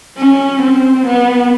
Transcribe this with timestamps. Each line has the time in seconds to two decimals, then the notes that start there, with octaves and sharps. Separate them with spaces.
0.18 C#4
0.62 C4
1.06 B3